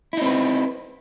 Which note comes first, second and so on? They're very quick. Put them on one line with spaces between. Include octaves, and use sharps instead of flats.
E4 D#4 C4 B4